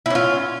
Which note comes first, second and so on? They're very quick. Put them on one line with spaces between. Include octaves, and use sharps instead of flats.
E4 C#4 F4